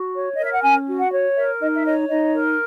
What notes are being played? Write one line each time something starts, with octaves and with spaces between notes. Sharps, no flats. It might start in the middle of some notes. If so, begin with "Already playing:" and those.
Already playing: F#4
C#5
A#4 D#5
E5
F#5
C#4 G#5
F#4
F#5
C#5
A#4 E5
D#4 D#5
E5
C#5 D#5
D#4 D#5
A#4